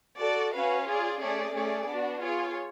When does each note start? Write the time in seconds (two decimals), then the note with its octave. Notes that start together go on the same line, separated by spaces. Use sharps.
0.18 F#4 A4 D5
0.52 C#4 F#4 B4 F5
0.86 F4 G#4 D5
1.20 A3 C#4 G#4 D5
1.54 A3 C#4 G#4 D5
1.87 B3 D4 F#4
2.21 F4 G#4 C#5